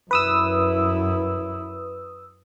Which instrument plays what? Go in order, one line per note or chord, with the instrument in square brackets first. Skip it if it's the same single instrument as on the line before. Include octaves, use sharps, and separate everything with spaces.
[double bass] F#2 E4 [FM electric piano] B4 D#6 E6